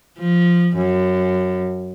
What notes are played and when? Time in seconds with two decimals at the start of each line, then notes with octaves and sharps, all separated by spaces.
0.19 F3
0.77 F#2